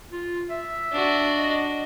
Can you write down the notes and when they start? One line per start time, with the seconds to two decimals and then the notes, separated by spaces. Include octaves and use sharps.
0.12 F4
0.50 E5
0.93 D4 F#4
1.38 D#5